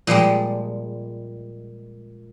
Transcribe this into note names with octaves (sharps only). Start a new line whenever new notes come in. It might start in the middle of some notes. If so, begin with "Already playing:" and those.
A#2 F3 G3 G#3